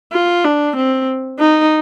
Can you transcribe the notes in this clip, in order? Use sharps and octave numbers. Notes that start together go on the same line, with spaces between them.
F4
D4
C4
D#4